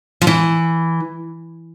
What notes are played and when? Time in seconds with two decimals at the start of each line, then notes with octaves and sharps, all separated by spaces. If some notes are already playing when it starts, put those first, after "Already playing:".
0.21 F3
0.27 E3